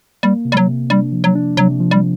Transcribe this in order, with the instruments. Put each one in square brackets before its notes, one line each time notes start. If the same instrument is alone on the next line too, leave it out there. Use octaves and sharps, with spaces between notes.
[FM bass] G3 [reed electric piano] A#3
[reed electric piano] C3
[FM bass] G3
F#3
[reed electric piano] C3
[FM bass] G3 [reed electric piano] D4
[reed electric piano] F3
[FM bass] F#3
[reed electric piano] D4
[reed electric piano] C3 [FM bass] F#3
[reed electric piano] F3
[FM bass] G3